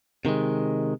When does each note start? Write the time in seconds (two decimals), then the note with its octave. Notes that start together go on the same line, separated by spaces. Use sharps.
0.25 C3 D#3 G#3